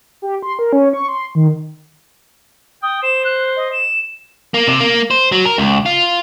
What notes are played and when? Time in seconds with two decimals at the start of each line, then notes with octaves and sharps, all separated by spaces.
0.22 G4
0.43 C6
0.59 A#4
0.73 C#4
0.93 C#6
1.09 C6
1.35 D#3
2.83 G5 D#6
3.03 C5 E7
3.25 F#6
3.57 D#5
3.73 E7
4.54 A#3
4.67 C3
4.80 A#3
5.11 C5
5.32 F#3
5.45 A#4
5.58 C#2
5.86 F4